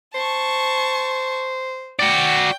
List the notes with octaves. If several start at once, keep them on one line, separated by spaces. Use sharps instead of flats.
C5 A5 C#6
F#4 D5 G5